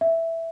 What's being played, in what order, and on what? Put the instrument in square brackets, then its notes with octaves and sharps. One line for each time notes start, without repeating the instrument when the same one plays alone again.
[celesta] E5